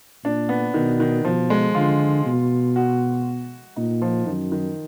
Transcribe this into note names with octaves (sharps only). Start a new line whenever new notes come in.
A#2 D4
B3
B2 D#3
D#3
B2 F3
G#3
D3 F4
B2
F#4
A#2 D#4
F3
F#2 D#3
D#3